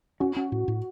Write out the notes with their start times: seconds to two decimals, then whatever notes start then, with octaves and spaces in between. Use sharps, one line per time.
0.20 C#4 F#4
0.36 C#4
0.52 A2
0.68 A2